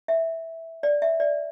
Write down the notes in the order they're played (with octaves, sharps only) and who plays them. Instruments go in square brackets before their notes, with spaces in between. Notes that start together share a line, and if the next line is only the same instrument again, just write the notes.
[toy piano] E5
D5
E5
D5